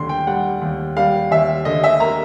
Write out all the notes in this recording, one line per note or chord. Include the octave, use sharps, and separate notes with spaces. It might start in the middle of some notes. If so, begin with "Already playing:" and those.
Already playing: D#2 D3 C6
G5
G3 F#5
D#2
G3 F5
D#2 E5
D3 D#5
E5
A#3 A#5